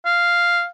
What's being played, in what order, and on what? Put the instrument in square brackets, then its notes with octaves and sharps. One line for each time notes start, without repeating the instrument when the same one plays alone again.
[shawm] F5